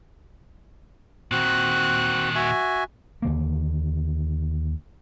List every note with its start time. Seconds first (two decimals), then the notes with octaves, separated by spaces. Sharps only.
1.31 A#2 D#3 C4 F#4 F#6
2.35 F#4 E5 G#5
3.22 D#2 D3 A#3